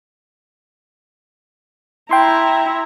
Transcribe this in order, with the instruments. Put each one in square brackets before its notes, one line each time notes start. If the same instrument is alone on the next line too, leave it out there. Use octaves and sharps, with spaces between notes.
[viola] E4 A#5 [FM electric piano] G5 C6